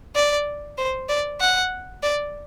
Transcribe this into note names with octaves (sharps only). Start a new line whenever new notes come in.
D5
C5
D5
F#5
D5